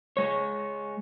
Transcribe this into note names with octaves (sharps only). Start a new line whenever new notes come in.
G#3 C#5